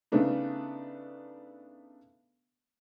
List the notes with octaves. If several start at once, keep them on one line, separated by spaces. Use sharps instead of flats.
C#3 A3 B3 D4 D#4